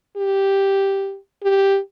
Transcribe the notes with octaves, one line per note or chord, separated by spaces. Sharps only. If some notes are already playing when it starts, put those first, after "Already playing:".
G4
G4